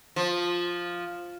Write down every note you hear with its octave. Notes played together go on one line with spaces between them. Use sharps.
F3